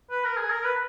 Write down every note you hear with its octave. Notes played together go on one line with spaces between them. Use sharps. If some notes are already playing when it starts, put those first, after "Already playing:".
B4
A#4
G#4
A#4
B4